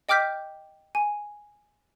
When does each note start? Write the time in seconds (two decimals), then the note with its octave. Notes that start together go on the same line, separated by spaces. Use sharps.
0.09 D#5 G5 D6 F6 G6 B6
0.95 G#5